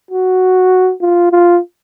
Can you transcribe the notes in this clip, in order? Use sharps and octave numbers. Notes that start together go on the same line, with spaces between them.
F#4
F4
F4